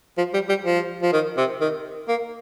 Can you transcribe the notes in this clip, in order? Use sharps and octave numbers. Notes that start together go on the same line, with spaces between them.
F3
G3
G3
F3
F3
D#3
C3
D#3
A#3